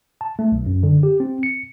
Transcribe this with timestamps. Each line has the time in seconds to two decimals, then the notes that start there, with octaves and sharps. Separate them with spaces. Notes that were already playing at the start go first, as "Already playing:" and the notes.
0.21 A5
0.39 A3
0.52 B1
0.66 F#2
0.83 D3
1.03 G4
1.20 C4
1.43 C#7